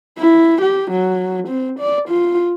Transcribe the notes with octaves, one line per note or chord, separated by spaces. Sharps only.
E4
G4
F#3
C4
D5
F4